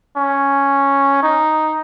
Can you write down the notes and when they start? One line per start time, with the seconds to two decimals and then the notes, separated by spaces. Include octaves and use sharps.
0.17 C#4
1.23 D#4